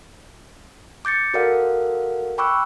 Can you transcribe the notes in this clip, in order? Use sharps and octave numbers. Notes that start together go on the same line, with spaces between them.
D6 G6 A6 C#7
F#4 A4 A#4 D5 F5 F#5
G5 B5 C#6 D6 E6 F#6